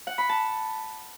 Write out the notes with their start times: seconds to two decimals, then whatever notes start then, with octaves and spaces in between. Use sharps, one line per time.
0.07 F#5
0.18 B5
0.29 A5